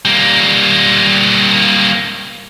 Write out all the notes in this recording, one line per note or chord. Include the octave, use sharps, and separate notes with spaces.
G3 A#3